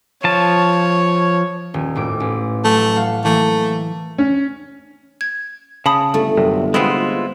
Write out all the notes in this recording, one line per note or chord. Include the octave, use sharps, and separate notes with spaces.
F3 C#5 A5
D#1
G#1 A2 D6
A1
F#3 A3
F5 F#5
E3 A3 A#3
C#4
G#6
C#3 A5 B5 D#6
G1 A3
C2 F#2 C3
G#3 B3 C4 E4 F4